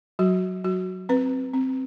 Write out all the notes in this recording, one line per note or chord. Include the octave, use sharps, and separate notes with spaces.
F#3 F#4
F#3 F#4
C4 B4
C4